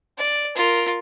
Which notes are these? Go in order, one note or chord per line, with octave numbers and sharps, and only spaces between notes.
D5
F4 A#4